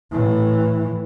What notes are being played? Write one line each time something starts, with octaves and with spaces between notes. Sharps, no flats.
A2 E3